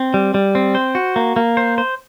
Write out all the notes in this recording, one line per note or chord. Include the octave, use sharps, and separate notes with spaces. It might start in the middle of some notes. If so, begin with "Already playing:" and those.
Already playing: C4
G3
G3
C4
C5
F#4
A#3
A#3
C5
C5